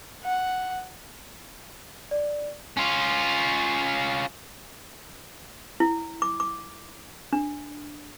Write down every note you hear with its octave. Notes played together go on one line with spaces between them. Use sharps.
F#5
D5
C#4 F4
E4
D6
D6
D4